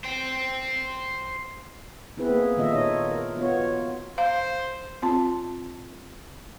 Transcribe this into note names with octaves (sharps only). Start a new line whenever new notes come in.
C5 G5
B3 C4 E4 G#4 B4
A#3 G#4
A#2 D#3 A3 F4 D#5 E5
D#4 C#5 D#5
A#4
B3 F4 F#4 C#5
C5 F5
C4 F4 A5